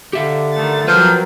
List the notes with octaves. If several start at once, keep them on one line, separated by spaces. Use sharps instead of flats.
D3 G4 E5 F5
D#3 A3 A6
F3 F#3 C4 A#4 B4